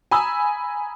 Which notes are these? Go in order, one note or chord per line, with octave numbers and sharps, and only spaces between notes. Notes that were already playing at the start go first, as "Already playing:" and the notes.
G#5 A#5 B5 D#6 E6